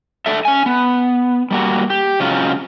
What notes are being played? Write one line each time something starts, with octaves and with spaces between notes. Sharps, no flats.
F#3 D4 A4 E5
C#4 G#5
B3
G3 A#3 F#4
G4
C#3 F#3 G#3 C4 C#4 F4